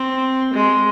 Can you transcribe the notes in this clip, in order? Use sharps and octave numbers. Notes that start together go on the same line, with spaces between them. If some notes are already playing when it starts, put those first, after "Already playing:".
Already playing: C4
G#3